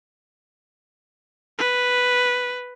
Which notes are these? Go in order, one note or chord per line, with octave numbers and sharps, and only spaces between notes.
B4